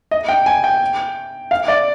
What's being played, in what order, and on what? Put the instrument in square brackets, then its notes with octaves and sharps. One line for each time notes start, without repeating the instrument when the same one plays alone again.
[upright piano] D#5
G5
G#5
G5
F5
D5